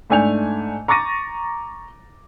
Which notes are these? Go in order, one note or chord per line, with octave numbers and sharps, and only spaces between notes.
G#2 A3 D4 G#5 G6 F7
A#5 C#6 D6 A6 A#6 D#7